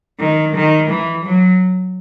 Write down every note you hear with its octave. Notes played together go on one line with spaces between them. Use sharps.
D#3
D#3
E3
F#3